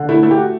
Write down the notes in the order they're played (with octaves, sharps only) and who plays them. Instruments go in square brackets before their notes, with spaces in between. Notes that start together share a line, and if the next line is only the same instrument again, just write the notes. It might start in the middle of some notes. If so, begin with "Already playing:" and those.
Already playing: [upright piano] D3
A3 E4
A3 E4
G4
F#4